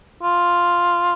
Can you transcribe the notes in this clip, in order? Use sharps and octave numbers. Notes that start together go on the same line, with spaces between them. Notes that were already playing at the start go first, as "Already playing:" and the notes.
F4